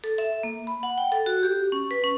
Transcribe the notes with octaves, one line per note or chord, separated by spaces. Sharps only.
A4
E5
A#3
B5
F#5
G5
A4
F#4
G4
C#4
B4
C#4